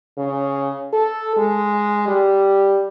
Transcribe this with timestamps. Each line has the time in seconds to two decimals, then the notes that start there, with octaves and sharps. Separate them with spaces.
0.18 C#3
0.93 A4
1.37 G#3
2.08 G3